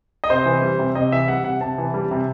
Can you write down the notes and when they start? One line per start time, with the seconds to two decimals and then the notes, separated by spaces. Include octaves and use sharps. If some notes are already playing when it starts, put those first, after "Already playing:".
0.24 D#5
0.30 C3 C5
0.46 E3
0.62 G3
0.79 C3
0.95 C3 D#5
1.12 E3 E5
1.28 G3 F#5
1.44 C3 F#5
1.61 C3 A5
1.78 E3
1.94 G3
2.11 C3